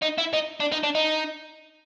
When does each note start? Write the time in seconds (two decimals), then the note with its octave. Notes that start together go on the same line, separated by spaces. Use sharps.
0.02 D#4
0.18 E4
0.34 D#4
0.60 D4
0.72 D#4
0.83 D4
0.95 D#4